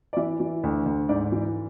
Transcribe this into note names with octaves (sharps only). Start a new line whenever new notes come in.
D5
E3 E5
E3
D2
D2
G#2 D5
E3